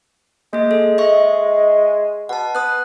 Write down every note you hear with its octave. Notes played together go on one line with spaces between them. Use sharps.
G#3 A#3 G#4
A4
D#5 E5 C#6
B2 F#5 A5
B3 D#6 F#6